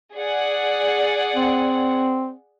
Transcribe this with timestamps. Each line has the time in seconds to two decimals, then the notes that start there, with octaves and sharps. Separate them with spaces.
0.15 G#4 D5 F#5
1.35 C4